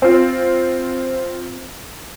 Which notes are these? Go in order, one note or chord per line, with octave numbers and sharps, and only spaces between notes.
C4 F4